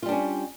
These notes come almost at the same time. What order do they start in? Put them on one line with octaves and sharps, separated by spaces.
F4 G3 D4 C#4